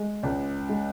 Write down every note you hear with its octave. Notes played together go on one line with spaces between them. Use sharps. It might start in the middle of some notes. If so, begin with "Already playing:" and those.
Already playing: G#3
C#2
G#3